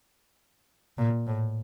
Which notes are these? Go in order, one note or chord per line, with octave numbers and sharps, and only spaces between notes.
A#2
A2